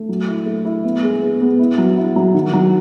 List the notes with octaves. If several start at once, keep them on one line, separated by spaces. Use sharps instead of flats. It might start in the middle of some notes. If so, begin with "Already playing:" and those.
Already playing: A3
F#3
E4
A3
E4
B3
G#3
B3
B3
E4
F#3
E4
F#3
D#3
F#3